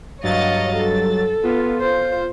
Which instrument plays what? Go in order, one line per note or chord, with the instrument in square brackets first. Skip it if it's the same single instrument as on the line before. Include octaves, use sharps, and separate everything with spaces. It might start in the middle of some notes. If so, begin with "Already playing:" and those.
[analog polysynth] G2 F#3 A6 [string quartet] C#5 D#5 F5
[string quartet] A4
[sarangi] B3 [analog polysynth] F4
[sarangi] C5